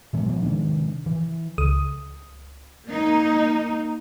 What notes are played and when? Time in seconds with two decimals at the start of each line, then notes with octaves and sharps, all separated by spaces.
0.13 A#2 E3 G#3 B3
0.26 F3 F#3 A#3 B3
0.42 C3 D#3 G#3 D4
1.06 E3
1.58 C#2 D#6
2.86 A#3 D#4